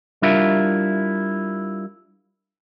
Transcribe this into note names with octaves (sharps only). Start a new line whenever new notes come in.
G3 D4 E4 F4 A#4 E5